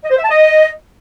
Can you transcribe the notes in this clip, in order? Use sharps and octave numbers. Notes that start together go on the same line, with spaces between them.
D#5
C5
E5
A5
D#5